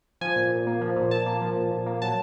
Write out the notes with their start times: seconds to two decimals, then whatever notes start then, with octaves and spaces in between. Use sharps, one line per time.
0.21 F3 G#5
0.36 A#2
0.51 A#2
0.67 A#3
0.81 F3
0.96 A#2
1.11 A#2 A5
1.26 A#3
1.42 F3
1.56 A#2
1.72 A#2
1.86 A#3
2.02 F#3 A5